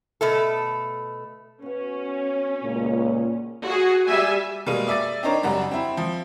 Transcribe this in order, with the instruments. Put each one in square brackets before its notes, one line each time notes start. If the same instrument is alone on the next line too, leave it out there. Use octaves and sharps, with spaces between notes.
[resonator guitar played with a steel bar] B2 A3 A4
[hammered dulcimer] B2 F#5 [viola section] C#4
[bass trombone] C#2 [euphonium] A#2
[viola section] F#4 G#4
G3 E5 G#5
[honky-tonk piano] B2 G3 G#3 A#3 F5 D#7
D5 E5 D6 A6
C4 D4 D#4 A#4 C#5
F#2 C#3 G3 F#5 A#5
C4 E4
F3